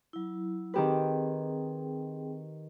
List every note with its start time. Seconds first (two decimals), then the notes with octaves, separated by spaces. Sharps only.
0.13 F#3 E4
0.74 D#3 C4 G4 G#4 B4 G5